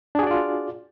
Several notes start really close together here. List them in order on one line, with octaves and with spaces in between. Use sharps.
D4 G#4 F#4 D5 F4